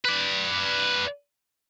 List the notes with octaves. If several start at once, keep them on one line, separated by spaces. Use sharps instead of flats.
B4 D5